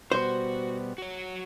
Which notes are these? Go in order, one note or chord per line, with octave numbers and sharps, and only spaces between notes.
B2 G3 B3 F#4 C5
F#4 C#5